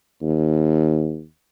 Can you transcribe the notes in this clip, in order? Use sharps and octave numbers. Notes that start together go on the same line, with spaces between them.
D#2